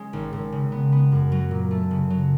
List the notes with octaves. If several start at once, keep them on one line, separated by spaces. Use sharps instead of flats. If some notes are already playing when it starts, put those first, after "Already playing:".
Already playing: G#3 C#4
G#1
G#1
C#3
B3
B3
F#2
F#3
A#2
A3
C#3
F#3